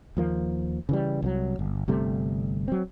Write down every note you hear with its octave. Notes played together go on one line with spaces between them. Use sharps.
D#2 F3 A#3
C#3 E3 G3
C2 F3 F#3
G1
G1 C3 G3 A3
F#3 C4